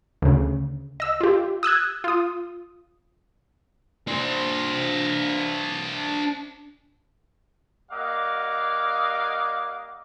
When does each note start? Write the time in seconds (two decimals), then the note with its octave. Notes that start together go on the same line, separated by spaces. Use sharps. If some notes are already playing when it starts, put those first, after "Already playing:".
0.22 D2 C#3
1.00 D#5 E6
1.21 F4 G4
1.63 D#6 E6 F#6 G#6
2.04 F4 D#6
4.08 D4 C5
7.91 G3 A#3 D#5 F5 F#5 D6